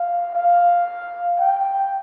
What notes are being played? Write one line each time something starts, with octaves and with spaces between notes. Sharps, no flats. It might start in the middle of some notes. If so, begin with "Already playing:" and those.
Already playing: F5
F5
G5